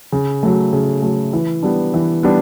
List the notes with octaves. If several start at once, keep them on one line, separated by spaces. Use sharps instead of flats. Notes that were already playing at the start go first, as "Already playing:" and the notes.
C#3
F#3 A3
C#3
F#3 A3
E3
G3 B3 D4
E3
G3 B3 D4